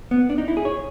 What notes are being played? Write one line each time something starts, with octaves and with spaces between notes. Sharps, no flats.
B3
D4
D#4
E4
G#4
C#5